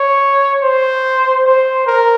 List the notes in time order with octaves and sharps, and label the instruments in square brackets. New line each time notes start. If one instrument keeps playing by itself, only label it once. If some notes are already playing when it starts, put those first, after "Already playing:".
Already playing: [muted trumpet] C#5
C5
C5
A#4